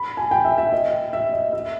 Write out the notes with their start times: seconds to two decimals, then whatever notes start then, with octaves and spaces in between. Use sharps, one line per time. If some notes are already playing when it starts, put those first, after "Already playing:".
Already playing: B5
0.17 G#5
0.31 G5
0.45 E5
0.58 E5
0.72 D#5
1.13 E5
1.33 D#5
1.53 E5